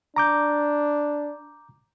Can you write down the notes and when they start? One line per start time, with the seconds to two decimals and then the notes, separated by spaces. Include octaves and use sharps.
0.16 D4 A#5 D6 G6